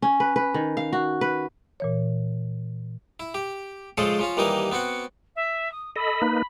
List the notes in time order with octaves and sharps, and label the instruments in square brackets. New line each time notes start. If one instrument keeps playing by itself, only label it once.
[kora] C#4
B4
B4
D#3
F5
F#4
B4
[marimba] A#2 E3 C#5
[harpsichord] E4
G4
C#3 F3 G#3 F4 A4 C5
F3 C#4 F4
D#2 E3 G3 A#3 D#4 A#4
B3 C4 F#4 F#5
[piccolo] E5
D#6
[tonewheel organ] A4 D#5 [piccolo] B5
[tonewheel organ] A#3 D#4 B4